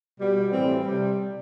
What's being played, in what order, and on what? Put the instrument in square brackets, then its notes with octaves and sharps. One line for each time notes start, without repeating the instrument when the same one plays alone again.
[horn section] B2 G3
A2 E3 G3 C4
C3 G3